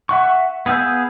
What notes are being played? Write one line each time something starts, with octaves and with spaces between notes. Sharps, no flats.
E5 F#5 C#6
B3 G#4 F5 E6 G6